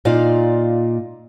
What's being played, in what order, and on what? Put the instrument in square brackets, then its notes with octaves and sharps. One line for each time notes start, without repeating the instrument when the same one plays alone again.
[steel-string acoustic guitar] A#2 D#4 F4 D5 F5